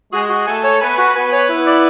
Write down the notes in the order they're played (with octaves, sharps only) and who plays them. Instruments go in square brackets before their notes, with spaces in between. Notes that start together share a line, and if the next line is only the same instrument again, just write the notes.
[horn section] G#3 G#4 [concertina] F#4
[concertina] F#4
[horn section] A3 A4 [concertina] G#5
[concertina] C#5
[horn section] B3 B4 [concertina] G#5
[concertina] F#4
[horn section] B3 B4 [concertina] G#5
[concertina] C#5
E4
D5